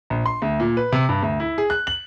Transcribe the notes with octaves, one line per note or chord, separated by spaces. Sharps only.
A#1
C6
D2
A#2
B4
C3
G2
D2
E4
G#4
F#6
F#7